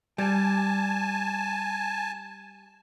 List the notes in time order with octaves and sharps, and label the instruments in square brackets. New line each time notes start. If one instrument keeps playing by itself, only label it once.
[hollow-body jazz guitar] G3 [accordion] G#5 A5